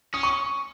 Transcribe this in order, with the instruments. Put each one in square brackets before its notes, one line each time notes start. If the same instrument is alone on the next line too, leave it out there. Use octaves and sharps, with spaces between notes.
[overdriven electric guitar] C#4 [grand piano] D#6
[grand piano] C#6